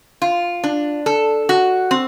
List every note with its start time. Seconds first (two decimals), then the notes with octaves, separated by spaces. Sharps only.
0.22 F4
0.64 D4
1.06 A4
1.49 F#4
1.91 C4